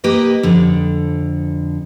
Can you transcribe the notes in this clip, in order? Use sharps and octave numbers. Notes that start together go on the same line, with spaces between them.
A#3 G4 B4 D#5
F2 D3